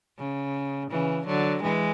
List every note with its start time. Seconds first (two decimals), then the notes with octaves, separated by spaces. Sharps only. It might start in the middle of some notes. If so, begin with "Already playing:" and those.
0.18 C#3
0.91 C#3 E3
1.27 D3 F#3
1.63 E3 G#3